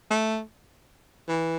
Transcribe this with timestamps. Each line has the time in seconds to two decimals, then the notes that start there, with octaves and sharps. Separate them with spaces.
0.11 A3
1.28 E3